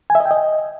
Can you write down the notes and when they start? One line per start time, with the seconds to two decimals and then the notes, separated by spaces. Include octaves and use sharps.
0.10 G#5
0.15 E5
0.20 D#5
0.25 G5
0.31 D#5